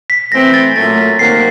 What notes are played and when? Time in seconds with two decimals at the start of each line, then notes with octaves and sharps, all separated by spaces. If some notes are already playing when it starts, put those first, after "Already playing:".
0.10 B6
0.32 E3 A3 C4 A#6
0.54 A6
0.76 A#2 F#3 A3 A6
0.98 B6
1.19 C3 D#3 F#3 A#3 C7